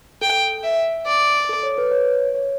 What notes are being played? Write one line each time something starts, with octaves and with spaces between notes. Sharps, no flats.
A4 G5
E5
D5
A4
C#5
B4
C#5
C#5